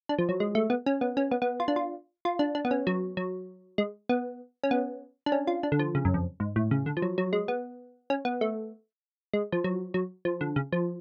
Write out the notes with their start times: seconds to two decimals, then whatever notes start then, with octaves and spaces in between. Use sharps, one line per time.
0.09 D4
0.18 F3
0.29 F#3
0.40 G#3
0.55 A3
0.70 B3
0.86 C#4
1.01 B3
1.17 C#4
1.31 B3
1.42 B3
1.60 F4
1.68 D4
1.76 F4
2.25 F4
2.39 D4
2.55 D4
2.65 B3
2.71 C#4
2.87 F#3
3.17 F#3
3.78 G#3
4.09 B3
4.64 C#4
4.71 B3
5.26 D4
5.32 C#4
5.47 F4
5.63 D4
5.72 D3
5.79 F3
5.95 C#3
6.05 F#2
6.14 F2
6.40 G#2
6.56 A2
6.71 C#3
6.86 D3
6.97 F3
7.02 F#3
7.18 F#3
7.33 G#3
7.48 B3
8.10 C#4
8.25 B3
8.41 A3
9.33 G#3
9.52 F3
9.64 F#3
9.94 F#3
10.25 F3
10.41 D3
10.56 C#3
10.72 F3